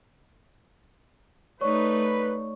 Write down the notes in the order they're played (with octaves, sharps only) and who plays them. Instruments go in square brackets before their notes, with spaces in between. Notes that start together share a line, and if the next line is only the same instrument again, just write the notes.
[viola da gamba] A3 D#4 [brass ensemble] B4 [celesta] C#5 D5 C#6